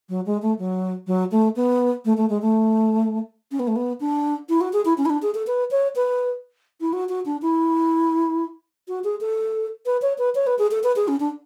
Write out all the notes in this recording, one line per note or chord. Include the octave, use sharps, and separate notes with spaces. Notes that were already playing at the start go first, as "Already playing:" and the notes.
F#3
G#3
A3
F#3
F#3
A3
B3
A3
A3
G#3
A3
C#4
B3
A3
B3
D4
E4
F#4
G#4
E4
C#4
E4
D4
G#4
A4
B4
C#5
B4
E4
F#4
F#4
D4
E4
F#4
G#4
A4
B4
C#5
B4
C#5
B4
G#4
A4
B4
G#4
C#4
D4